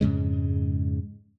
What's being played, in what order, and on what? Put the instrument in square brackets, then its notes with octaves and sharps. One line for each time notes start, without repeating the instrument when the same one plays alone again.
[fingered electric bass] F2 G#2 C#3 G#3